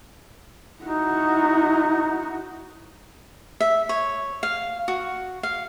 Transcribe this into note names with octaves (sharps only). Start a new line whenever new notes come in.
D#4 E4 F#4
E5
C#5
F5
F#4
F5